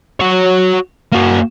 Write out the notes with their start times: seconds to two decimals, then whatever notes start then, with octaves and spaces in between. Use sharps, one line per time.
0.20 F#4 C#5
1.13 A#3 F#4